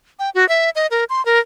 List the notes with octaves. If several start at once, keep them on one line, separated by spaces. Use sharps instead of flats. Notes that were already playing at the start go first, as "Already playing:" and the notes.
G5
F#4
E5
D#5
A#4
C6
A#4